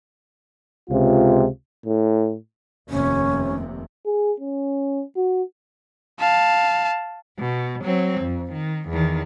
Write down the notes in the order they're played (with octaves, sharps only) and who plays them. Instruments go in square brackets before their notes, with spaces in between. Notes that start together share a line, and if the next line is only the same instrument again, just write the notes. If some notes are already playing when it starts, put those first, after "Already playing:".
[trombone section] C#2 C3 G#3 F4
[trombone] A2
[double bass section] F1 D#2 C3 [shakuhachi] C#4
[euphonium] G#4
C#4
F#4
[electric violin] F5 A5
[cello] B2
F#3 C4
F2
D#3
E2 D#3